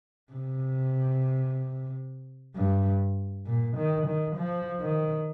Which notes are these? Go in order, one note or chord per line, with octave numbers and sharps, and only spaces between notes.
C3
G2
A#2
D#3
D#3
F3
D#3